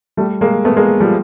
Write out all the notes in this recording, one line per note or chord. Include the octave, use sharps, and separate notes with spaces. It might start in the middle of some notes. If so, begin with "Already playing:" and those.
G3 A3
G#3 A#3
A3 B3
G#3 A#3
F3 G3